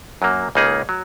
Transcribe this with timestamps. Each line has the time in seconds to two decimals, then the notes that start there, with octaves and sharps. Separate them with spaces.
0.22 F#2 F#3 A#3
0.55 C#2 C#3 A#3 D#4 G#4
0.89 F#3